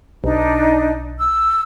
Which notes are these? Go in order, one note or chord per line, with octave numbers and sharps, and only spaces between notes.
B1 D4 D#4
E6